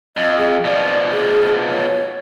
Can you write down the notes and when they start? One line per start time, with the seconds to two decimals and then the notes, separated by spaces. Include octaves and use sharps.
0.17 F2 D#5
0.38 G#4
0.65 B2 F3 D5
1.12 G#4
1.70 C#5